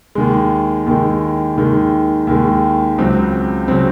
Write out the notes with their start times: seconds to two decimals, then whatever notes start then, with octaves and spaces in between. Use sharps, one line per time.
0.15 D#2 D#3 G#3
0.86 D#2 D#3 G#3
1.57 D#2 D#3 G#3
2.27 D#2 D#3 G#3
2.98 C#2 C#3 F#3 C4
3.68 C#3 F#3 C4